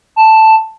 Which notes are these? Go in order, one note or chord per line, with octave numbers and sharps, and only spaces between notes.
A5